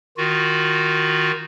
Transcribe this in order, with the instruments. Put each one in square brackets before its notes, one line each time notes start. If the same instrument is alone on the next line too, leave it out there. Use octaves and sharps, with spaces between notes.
[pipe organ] D#3 F4 F#4